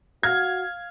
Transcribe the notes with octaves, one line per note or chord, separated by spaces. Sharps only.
F#4 F5 G#6